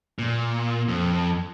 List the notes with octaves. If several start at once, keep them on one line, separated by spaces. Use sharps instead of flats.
A#2
F2